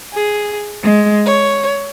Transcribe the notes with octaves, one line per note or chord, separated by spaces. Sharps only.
G#4
G#3
C#5